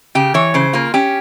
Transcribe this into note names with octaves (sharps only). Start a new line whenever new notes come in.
C#3 G4
E3 C#5
C#3 C5
A#3 F4
C#4 G4